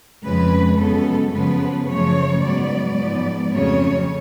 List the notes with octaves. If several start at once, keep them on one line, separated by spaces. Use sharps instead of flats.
F2 C#3 G#3 B4
F#2 C#3 G#3 B3 A4
F#2 C#3 F3 B3 B4
F#2 C#3 F3 A3 C#5
G#2 F#3 B3 D5
G#2 F3 B3
F2 C#3 F#3 A3 C#5